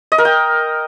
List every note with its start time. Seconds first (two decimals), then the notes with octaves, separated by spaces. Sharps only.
0.12 D#5
0.18 A#4
0.25 G5